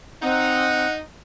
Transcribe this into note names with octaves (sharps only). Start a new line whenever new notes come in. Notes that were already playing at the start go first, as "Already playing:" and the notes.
C4 D#4 F#5